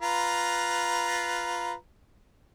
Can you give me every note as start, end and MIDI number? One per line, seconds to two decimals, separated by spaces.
0.01 1.74 65
0.01 1.74 71
0.01 1.74 82